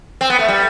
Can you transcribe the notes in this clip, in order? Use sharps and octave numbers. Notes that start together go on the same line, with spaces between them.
C4
B3
A3
G3